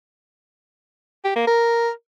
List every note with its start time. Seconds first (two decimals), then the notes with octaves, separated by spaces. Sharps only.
1.24 G4
1.36 A#3
1.47 A#4